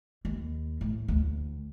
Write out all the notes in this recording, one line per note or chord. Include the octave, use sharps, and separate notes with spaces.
D#2
A2
D2